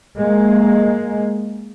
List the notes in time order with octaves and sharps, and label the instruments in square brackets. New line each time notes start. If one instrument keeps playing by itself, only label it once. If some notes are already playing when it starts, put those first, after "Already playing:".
[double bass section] G#3 A#3